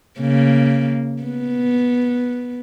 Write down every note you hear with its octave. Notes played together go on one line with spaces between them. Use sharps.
C#3 A#3
B3